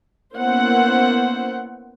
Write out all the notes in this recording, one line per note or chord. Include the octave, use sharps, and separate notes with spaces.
A#3 B3 C#4 E4 C5 F#5